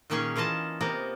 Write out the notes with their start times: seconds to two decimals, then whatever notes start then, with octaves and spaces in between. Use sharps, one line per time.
0.10 A#2 D#3 A#3 C#4 G#4 C#5
0.36 E3 A#3 F4 D#5 A5
0.81 C3 A#3 B3 A#4